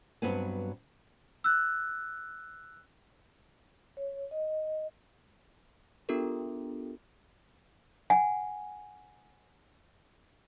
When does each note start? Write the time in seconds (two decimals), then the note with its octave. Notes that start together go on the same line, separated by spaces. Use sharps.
0.22 G2 F#3 B3 C4 G#5
1.44 E6 F#6
3.97 C#5
4.31 D#5
6.09 B3 D4 F4 G4 A4 A#4
8.10 F#5 G#5